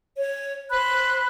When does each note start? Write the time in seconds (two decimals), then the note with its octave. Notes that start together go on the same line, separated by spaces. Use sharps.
0.16 C#5
0.70 C5 B5 F#6